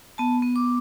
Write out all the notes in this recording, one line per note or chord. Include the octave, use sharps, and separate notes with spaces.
B3 A5
B3
D6